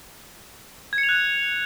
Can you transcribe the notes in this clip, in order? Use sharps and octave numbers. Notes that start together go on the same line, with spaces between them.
G#6
C#7
F7
F#6